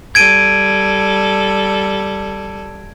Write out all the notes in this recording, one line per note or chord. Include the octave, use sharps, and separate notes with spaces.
G3 A4 G#6 D7 D#7